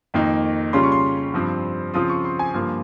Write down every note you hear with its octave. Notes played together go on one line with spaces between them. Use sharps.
F2 D#3 A#3 D#4
C#3 G3 C#4 F4 C6
C#6
C6
G2 F3 C4
C#3 F3 C4 F4 D#6
C#6
C6
G#5
G2 F3 A#3 F4